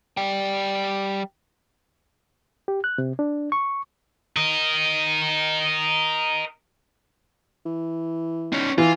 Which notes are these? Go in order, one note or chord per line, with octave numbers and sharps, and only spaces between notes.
G3 G5
G4
F#6
C3
D4
C#6
A#4 D#5
E3
C#4 D#4
E3 F4